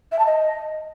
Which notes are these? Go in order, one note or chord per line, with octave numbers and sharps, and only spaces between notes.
E5
A5
D#5